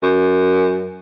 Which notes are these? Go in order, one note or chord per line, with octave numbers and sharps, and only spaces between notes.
F#2